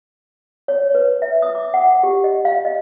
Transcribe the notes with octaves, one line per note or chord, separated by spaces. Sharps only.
C#5
B4
E5
D#6
D6
F#5
G4
D#5
F5
D#5